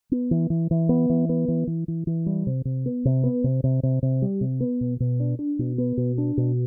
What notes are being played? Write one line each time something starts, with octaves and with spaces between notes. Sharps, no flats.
B3
E3
E3
E3
B3
E3
B3
E3
E3
E3
E3
G3
C3
C3
B3
C3
B3
C3
C3
C3
C3
G3
C3
B3
B2
B2
D4
D4
B2
B3
B2
D4
B2